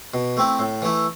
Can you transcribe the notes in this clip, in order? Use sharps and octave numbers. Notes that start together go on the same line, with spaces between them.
B2
A3 C4 E4
A2
E3 A3 E4